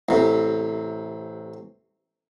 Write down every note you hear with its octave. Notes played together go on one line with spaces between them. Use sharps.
A1 C3